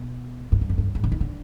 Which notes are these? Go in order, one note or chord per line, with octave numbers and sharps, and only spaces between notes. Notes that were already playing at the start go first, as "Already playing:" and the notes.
Already playing: B2
G#2
G2
F2
G2
G#2
D3
D#3
D3